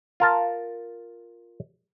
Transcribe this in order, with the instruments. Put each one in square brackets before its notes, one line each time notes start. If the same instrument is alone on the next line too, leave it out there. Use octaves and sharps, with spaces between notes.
[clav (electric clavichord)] F4 A#4 A5